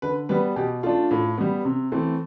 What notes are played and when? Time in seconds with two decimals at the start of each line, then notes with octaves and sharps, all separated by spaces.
0.02 D3 B4
0.29 G3 B3 B4
0.56 B2 G4
0.83 A3 D4 F4
1.11 A2
1.38 G3 B3
1.65 C3
1.92 E3 A3 C4